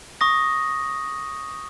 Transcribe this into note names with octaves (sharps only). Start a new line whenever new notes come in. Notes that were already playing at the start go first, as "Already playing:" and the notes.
C#6 D#6 A#6